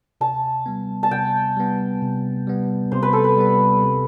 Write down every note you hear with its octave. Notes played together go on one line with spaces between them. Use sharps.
C3 A5
G3 B3
A5
C3 G5
G3 B3
C3
G3 B3
C3 C5
B4
A4
B4
G3 B3
C3